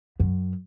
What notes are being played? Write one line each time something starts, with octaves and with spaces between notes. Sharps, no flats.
F#2